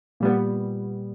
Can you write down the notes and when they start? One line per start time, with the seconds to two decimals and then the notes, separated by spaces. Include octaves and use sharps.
0.20 A#2 G3 B3